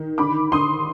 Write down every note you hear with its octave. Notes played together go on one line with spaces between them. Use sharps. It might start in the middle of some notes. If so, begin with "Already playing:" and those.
Already playing: D#3
D3 B5 D6
D3 C6 D#6